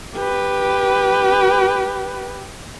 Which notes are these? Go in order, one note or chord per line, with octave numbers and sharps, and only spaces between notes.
G4 B4